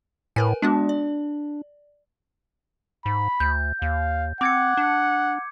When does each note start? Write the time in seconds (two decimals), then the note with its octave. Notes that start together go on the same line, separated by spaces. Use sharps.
0.36 A2 A#4 B4 G#5
0.62 G#3 B3 D4 F#4
0.89 D5
3.06 G#2 B5
3.40 D2 G6
3.82 D#2 F5
4.41 C4 F#5 D6 G#6 C#7
4.77 D4